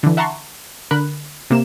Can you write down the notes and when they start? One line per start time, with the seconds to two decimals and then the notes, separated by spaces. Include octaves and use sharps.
0.03 D3 E3
0.17 E5 F#5 A5 A#5 C6 C#6
0.91 D3 A#4 B5 F#6
1.50 C3 A#3 E7